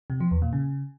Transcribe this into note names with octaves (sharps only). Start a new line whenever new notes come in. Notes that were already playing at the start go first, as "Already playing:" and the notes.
C3
F3
E2
A#2
C#3